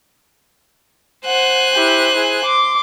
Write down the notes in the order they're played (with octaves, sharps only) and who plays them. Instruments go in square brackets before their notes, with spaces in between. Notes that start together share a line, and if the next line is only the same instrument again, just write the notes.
[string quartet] C5 G#5 F#6 [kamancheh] F#5
[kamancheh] E4 G4
E4 G#4
C6 D6